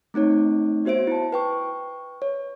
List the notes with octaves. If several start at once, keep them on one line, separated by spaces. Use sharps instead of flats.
A3 C4 D#4 C#5
B3 F#4 C5 E5 D7
E4 A5
B4 G5 C#6
C#5